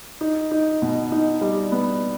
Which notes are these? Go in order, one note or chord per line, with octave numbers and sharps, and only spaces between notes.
D#4
D#4
B2
D#4
G3
B3